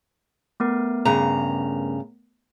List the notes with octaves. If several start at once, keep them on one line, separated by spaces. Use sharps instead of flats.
A3 B3 A#4
G2 C#3 A#5